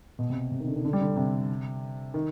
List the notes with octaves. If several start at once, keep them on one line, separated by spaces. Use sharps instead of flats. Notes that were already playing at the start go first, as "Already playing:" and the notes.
B2
C3
C3
D#3
D3
D#3
D3
G3
D3
C3
D#3